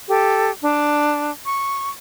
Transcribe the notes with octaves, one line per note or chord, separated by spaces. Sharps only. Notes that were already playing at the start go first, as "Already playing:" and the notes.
G4 A4
D4
C#6